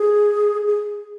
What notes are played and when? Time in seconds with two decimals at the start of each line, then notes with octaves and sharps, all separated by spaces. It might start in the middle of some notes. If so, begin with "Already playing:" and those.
Already playing: G#4
0.67 G#4